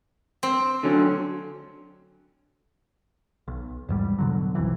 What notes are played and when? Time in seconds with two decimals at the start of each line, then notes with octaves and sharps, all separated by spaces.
0.43 C4
0.83 D3 F#3 C#4
3.48 B1
3.89 E2 G#2 G3
4.18 B2 D3 F#3
4.55 B1 F2 E3